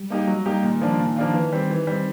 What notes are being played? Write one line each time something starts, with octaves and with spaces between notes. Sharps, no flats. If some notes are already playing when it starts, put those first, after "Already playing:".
Already playing: G3
A#3 D#4 G4
F#3
A#3 D#4 G4
A#2 D#3
F3 A#3 D4 F4
A#2
F3 A#3 D4 F4
E3
G3 C4
E3
G3 C4